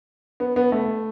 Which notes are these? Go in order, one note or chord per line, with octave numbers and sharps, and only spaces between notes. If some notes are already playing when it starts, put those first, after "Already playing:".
B3
B3
A3